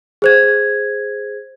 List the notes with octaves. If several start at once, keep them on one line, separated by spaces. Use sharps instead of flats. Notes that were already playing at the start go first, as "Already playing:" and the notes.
G#4 C5 G#6